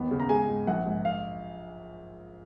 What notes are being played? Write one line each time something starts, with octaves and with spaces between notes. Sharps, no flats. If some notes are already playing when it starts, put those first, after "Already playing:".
Already playing: D#2 B3
C#3
A#5
G#3 G#5
G#2
A#1 F#5
G#2
F5